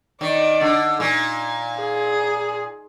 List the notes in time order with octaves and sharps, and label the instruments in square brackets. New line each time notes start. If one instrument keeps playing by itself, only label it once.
[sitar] D#3 [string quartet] D5
[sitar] D3
A#2
[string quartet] G#4